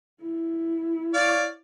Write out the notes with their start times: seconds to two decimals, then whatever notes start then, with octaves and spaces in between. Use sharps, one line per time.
0.21 E4
1.14 C#5 D5 F5